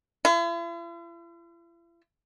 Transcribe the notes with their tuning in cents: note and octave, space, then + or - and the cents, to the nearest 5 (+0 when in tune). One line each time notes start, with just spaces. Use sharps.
E4 +45